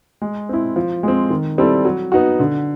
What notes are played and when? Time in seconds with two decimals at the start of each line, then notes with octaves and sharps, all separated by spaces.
0.22 G#3
0.49 C4 E4
0.76 F3
1.03 G#3 C4
1.30 D#3
1.58 G3 C4 E4 A4
1.85 F#3
2.12 B3 D#4 F#4
2.39 D3